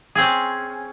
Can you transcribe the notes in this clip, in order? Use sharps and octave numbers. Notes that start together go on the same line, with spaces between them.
C4 C#4 G#4